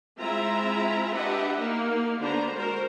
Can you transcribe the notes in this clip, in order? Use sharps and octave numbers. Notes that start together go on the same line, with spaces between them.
G#3 C4 E4 F4 E5 A#5
D4 G4 B4 D#5 E5 F#5
A#3 D#4
D3 B3 D4 F#4 C5 A#5
G#3 F#4 A#4 C5